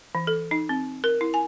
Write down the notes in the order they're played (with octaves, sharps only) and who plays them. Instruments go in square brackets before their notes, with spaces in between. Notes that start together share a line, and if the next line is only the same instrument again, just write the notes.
[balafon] E3
A4
D#4
C4
A#4
E4
G#5